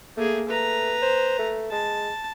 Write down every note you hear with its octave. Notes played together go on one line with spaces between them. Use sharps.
A3 A#3 G#4
A3 B4 A#5
C5
A3
G#3 A5